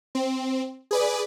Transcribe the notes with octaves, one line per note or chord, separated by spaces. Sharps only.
C4
G#4 B4 D5